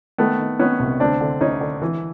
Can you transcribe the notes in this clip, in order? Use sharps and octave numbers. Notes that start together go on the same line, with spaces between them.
D#3 A3 B3
D#3
D#3 B3 C#4
C2
D2 C4 D4
D3
D2 C#4 D#4
D3
E3